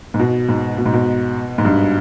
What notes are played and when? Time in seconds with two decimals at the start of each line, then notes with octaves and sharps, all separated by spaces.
0.14 G#2
0.19 B2
0.49 G#2
0.78 B2
0.86 G#2
0.94 B2
1.58 G#2
1.65 G2